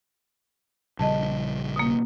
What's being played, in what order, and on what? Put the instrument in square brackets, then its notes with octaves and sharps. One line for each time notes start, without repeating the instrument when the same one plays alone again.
[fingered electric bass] A#1 C#3 G3 [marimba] D#5 A5
[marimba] B2 A#3